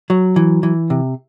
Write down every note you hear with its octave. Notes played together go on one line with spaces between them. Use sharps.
F#3
E3
E3
C3